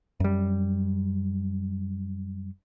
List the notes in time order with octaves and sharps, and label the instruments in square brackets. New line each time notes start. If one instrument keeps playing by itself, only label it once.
[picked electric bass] F#2 G3